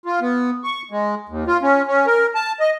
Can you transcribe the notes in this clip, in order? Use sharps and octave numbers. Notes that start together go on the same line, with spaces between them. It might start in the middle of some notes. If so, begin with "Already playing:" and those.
F4
B3
C#6
G#3
D#2
F4
C#4
C#4
A#4
A5
D#5